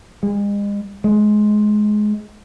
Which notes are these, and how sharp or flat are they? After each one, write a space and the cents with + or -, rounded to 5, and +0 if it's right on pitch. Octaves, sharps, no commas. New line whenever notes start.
G#3 -40
G#3 +20